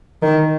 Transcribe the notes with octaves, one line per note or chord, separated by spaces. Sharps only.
D#3